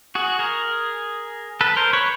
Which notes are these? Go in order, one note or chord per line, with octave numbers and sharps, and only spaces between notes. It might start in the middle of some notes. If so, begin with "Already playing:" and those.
F#4 G#4
G#4 A#4
A4 B4
A#4 C5
B4 C#5